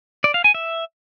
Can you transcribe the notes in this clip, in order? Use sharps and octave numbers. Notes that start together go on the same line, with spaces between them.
D5
F5
G#5
E5